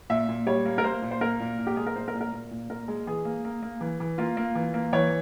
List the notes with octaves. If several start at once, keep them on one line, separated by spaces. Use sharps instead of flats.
A#2 E5
A#2
G3 C#5
A#3
A#4
A#3 C5
A#2
C5
A#3 A#4
A#2
A#2
G4
G#3 G#4
A#4
A#2 C5
A#4
A#2
A#4
A#2
A#2
A#2 A#4
G#3
E3 G#4
A#3
A#3
A#3
E3
E3
A#3 F4
A#3
E3
A#3
E3 C#5